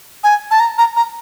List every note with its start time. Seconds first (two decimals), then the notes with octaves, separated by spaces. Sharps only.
0.24 G#5
0.51 A5
0.60 A#5
0.78 A#5
0.96 A#5